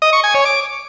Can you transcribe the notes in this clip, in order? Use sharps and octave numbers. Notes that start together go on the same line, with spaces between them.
D#5
C#6
G#5
C#5
D6